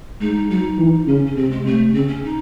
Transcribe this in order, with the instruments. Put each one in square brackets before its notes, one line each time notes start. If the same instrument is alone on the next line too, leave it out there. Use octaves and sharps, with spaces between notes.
[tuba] G#3 [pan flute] D#4
[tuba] F#3 [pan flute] D#4
[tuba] E3
[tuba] C#3 [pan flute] C#4
[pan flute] C#4
[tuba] C3 [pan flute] C4
[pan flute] G#3
[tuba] C3 [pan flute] A3
[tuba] C#3 [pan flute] C4
[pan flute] C#4
D#4